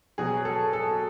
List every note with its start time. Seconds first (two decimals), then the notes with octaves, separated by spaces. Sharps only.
0.18 B2 F#3 G#4
0.45 A4
0.73 A4